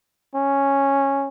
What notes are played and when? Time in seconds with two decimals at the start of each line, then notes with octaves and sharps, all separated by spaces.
0.35 C#4